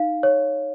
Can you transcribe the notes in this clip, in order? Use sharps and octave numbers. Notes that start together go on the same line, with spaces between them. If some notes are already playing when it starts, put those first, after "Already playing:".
Already playing: D#4 F5
C#5